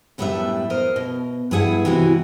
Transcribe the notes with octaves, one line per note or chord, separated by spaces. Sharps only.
F#2 A2 G3 B3 D4 E5
A#4 C5 D#5
B2
G2 B3 E4 G#4 E5 F#5
C3 E3 G#3 E4 F#4